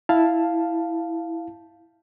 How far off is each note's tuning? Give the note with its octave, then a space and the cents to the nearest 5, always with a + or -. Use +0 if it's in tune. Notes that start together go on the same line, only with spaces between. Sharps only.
E4 +0 F5 +0 A5 +0